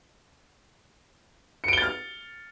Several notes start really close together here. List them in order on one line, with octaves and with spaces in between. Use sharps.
C#7 D7 G7 A6 F6